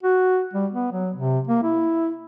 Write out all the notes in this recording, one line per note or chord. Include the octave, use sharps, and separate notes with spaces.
F#4
G3
B3
F#3
C3
A#3
E4